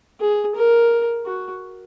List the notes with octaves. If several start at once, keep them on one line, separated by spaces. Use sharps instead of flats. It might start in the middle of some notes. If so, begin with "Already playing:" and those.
G#4
A#4
F#4